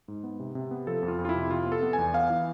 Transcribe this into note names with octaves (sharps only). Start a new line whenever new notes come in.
G#2
B3
C3
C3
B3
F3 A4
F2
F4
F2
F4
E4
C3
C3 F4
B3
A4
B3
G#5
E2
B3 F5
E3